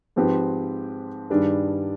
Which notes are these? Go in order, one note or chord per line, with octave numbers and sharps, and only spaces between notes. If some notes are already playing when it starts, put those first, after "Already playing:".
G#2 F3 C4 G4 B4
G2 D#3 G3 D4 G#4